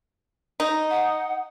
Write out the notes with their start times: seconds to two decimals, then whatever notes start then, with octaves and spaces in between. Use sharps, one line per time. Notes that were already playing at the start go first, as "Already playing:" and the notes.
0.60 D#4
0.90 F#5